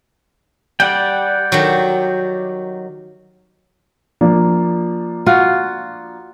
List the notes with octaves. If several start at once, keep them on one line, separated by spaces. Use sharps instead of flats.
G3 D5 F#5 G5
D#3 F#3
F3 A#3 D4
F4 F#4